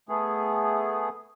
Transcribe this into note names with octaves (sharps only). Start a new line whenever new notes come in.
A3 B3 G#4